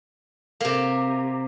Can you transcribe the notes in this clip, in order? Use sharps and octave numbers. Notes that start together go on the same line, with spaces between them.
C3 A#3